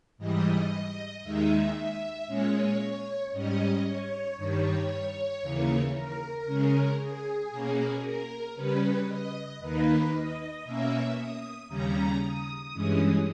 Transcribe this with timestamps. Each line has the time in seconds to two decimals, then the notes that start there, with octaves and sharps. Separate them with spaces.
0.18 G#2 E3 G3 D#5
1.23 D#2 D#3 G#3 D#4 E5
1.75 E5
2.27 A#2 G#3 C#4 C#5
3.32 G#2 G3 C#4 D#5
3.85 C#5
4.37 G2 D#3 G3 C#5
5.42 D#2 C#3 E3 A#3
5.94 A#4
6.45 C#3 G#3 C#4
6.98 G#4
7.51 B2 A#3 C#4
8.02 A#4
8.55 C#3 G3 C#4 B4
9.08 D#5
9.59 D#2 D#3 A#3 D#4 B4
10.13 D#5
10.64 B2 A#3 C#4 E5
11.17 D#6
11.69 D#2 C#3 G3 C#4 A#5
12.21 D#6
12.73 G2 E3 G#3 C#4